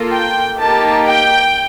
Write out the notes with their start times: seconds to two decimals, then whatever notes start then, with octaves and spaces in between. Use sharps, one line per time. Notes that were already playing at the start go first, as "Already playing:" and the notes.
Already playing: A#3 F4 A4
0.12 G5
0.58 A#3 D#4 G4 A5
1.05 G5